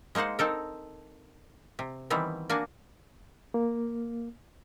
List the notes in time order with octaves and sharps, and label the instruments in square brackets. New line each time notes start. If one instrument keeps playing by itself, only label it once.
[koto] G#3 A#3 D#4 C5 F#5
C4 D#4 A4 A#4
C3
D#3 E3 G3 B3 C4
A#3 D4 F#4 G#5
[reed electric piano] A#3